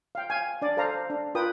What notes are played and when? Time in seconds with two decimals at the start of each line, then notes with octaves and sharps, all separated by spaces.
0.15 F5 G5
0.30 F5 G#5
0.62 D4 D5
0.77 A4 C5 F5 A#5
1.10 D4
1.35 F4 A#4 B4 G5 D#6